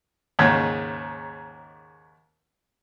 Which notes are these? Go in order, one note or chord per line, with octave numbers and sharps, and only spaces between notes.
D#2 G#2 C#3